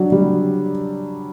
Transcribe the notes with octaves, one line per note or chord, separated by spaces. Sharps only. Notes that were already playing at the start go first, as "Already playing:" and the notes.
Already playing: F#3 D4
G3